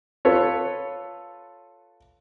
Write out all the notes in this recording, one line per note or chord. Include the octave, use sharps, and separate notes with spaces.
F4 A4 B4 C#5